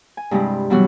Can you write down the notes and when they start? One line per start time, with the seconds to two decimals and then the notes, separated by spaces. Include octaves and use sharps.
0.17 G#5
0.31 G2 C3 G#3 C4 E4
0.70 B2 E3 F#3 G3 B3 F#4